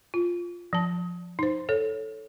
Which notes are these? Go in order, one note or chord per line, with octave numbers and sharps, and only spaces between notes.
F4
F3 A5
D#4 C5
A4 C#5